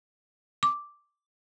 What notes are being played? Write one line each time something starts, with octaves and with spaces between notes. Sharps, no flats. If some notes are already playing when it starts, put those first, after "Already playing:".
D6